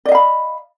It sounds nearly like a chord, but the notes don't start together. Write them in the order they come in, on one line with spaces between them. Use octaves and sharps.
D5 D#5 F5 B5